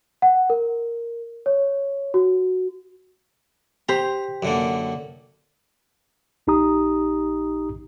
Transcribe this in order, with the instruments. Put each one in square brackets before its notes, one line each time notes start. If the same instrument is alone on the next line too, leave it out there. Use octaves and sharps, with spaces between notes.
[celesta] F#5
A#4
C#5
F#4
[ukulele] G4 C5 [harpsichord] A#5
[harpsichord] F#2 D3 A#3
[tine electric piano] A#1 D#4 G4 A#5 D#6